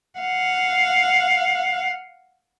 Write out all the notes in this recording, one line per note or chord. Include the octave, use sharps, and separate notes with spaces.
F5 F#5